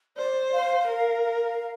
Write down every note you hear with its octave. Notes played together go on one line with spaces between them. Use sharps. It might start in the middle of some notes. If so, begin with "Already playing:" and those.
C5 D5
F5
A#4
F5